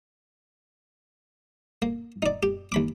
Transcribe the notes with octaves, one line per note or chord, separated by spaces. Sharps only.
A#3
D#4 D5
G4
D#2 B5 D6